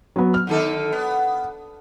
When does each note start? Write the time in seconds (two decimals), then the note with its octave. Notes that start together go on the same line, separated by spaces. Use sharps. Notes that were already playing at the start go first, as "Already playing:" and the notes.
0.16 F#3 B3
0.34 F6
0.47 D3 D#3 A4
0.93 B3